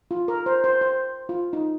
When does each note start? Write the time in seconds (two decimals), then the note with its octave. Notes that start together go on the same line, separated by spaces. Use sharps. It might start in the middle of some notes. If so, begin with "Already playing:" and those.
0.11 F4
0.28 A#4
0.46 C5
0.64 C5
0.81 C5
1.29 F4
1.53 D#4